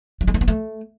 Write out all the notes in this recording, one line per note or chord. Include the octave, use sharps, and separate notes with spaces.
G3
G#3
A3
B3
A3